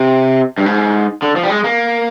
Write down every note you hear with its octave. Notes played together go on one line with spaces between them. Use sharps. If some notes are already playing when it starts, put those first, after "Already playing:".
Already playing: C3
G2
G#2
D3
F3
G3
G#3
A#3